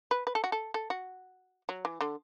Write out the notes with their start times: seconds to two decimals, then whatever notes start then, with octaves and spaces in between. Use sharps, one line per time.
0.11 B4
0.27 B4
0.35 A4
0.44 F#4
0.52 A4
0.74 A4
0.90 F#4
1.69 F#3
1.85 E3
2.01 D3